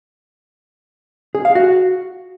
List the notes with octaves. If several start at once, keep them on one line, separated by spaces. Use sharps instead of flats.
G#4
F5
F#4